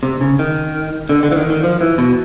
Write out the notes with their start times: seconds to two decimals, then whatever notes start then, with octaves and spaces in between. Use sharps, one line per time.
0.03 C3
0.21 C#3
0.39 D#3
1.09 D3
1.23 D3
1.31 E3
1.36 D#3
1.50 D#3
1.63 F3
1.81 E3
1.98 B2